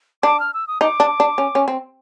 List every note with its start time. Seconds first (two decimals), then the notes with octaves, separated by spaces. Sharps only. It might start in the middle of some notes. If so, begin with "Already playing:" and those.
0.23 D4 D6
0.40 F6
0.54 E6
0.67 D#6
0.81 D#4 D6
1.00 D4
1.20 D4
1.38 C#4
1.55 C#4
1.68 C4